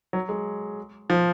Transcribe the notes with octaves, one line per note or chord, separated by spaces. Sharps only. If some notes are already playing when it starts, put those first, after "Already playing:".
F#3
G#3
F3